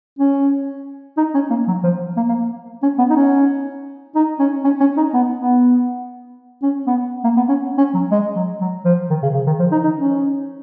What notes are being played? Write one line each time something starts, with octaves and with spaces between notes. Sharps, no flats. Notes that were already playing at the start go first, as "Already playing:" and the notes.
C#4
D#4
C#4
A#3
F#3
F3
A#3
A#3
C#4
B3
D#4
C#4
D#4
C#4
C#4
C#4
D#4
B3
B3
C#4
B3
A#3
B3
C#4
C#4
F#3
G#3
F#3
F#3
F3
D#3
C#3
C#3
D#3
F3
D#4
D#4
C#4